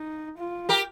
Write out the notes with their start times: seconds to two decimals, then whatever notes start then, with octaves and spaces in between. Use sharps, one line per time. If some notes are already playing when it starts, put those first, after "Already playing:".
Already playing: D#4
0.38 F4
0.69 G4 A#4